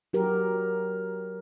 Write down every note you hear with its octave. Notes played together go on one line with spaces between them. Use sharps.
F#3 F#4 G4 A#4